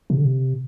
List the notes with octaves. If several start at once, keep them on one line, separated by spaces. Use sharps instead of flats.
C3
D3
C3